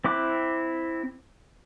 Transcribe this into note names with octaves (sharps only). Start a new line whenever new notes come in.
C4 E4 D6 F#6